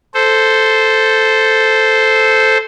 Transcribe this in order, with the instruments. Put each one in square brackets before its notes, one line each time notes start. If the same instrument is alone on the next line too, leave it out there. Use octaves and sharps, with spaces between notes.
[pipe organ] A4 C5